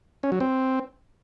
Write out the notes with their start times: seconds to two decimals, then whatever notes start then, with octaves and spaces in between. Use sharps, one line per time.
0.23 C#4
0.32 F#3
0.40 C4